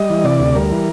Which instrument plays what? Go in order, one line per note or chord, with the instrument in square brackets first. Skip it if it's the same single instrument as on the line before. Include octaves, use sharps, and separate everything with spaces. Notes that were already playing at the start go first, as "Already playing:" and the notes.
Already playing: [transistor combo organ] G3 D#5
E3
C3 D5
D2
G3 A#4
E3